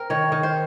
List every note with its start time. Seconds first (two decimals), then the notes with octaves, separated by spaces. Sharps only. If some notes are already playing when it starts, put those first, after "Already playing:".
Already playing: C4 A#4
0.10 D#3 C#5
0.32 D#3
0.43 C5